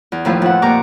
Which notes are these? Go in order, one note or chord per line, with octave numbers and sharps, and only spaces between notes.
E2
D#2 A2 F3 E4 B4
F2 F#5
A#2 A#3 G4 A#5 C#6 D6